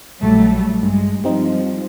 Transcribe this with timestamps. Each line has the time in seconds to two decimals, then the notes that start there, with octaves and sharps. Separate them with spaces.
0.23 A#1 F#3 G3 A3
0.83 G2 G#3
1.24 F3 G3 C4 D#4